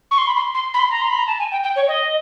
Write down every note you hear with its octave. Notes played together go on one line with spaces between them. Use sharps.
C#6
C6
B5
C6
C6
B5
C6
A#5
C6
B5
A#5
A5
G#5
G5
G5
C#5
D#5